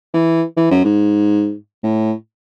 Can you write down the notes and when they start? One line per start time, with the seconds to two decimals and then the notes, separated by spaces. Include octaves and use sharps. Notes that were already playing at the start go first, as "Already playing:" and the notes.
0.14 E3
0.57 E3
0.71 F#2
0.85 G#2
1.83 A2